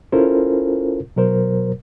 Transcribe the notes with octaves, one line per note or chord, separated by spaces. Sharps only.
C#4 E4 F4 A4 A#4 C5
B2 F#3 A#4 C5